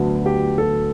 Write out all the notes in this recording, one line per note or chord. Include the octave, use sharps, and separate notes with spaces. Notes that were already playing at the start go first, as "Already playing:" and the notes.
Already playing: D2 D3 F#3 B3
G4
A4